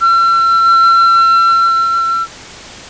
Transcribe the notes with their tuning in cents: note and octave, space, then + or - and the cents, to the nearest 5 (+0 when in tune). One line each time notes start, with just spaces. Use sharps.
E6 +45